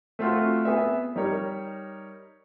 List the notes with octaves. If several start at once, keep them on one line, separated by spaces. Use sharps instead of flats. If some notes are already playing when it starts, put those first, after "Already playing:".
A3 C4 F4 F#4
B3 G#4 B4 E5
G3 D#4 A#4 C#5